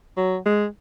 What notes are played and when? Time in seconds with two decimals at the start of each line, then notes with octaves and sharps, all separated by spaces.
0.17 F#3
0.45 G#3